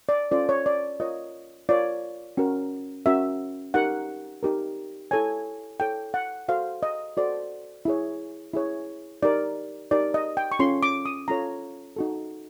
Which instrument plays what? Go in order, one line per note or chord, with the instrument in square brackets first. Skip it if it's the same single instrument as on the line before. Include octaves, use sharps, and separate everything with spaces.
[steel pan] D5
C#4 F4 A4 C5 D5
C#5
D5
F4 A#4 C#5 D#5
F4 A#4 C#5 D5
C#4 F#4 A#4
C#4 F#4 A#4 E5
D#4 G4 A#4 F#5
D#4 G4 A#4
E4 A4 C#5 G#5
E4 A4 C#5 G5
F#5
F#4 A4 C5 F5
D#5
F#4 A4 C5 D5
E4 G#4 C#5
E4 G#4 C#5
D#4 G4 A#4 D5
D#4 G4 A#4 D5
D#5
G5
C#6
C#4 F4 A4 C#5 C6
D6
D#6
C#4 F4 A4 C#5 A#5
D#4 F#4 A4